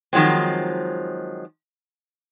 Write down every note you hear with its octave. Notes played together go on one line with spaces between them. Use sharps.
D#3 F3 F#3 G#3 C4